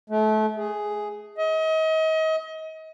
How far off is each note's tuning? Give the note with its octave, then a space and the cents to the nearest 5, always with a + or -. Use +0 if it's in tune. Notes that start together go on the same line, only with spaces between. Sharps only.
A3 -30
G#4 +5
D#5 +35